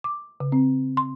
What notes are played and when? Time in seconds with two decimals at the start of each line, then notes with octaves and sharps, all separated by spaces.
0.04 D6
0.40 C#3
0.52 C4
0.97 C6